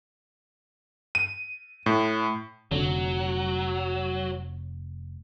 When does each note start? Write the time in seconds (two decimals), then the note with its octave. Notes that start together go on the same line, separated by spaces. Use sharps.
1.15 D#7
1.86 A2
2.71 F1 D3 F#3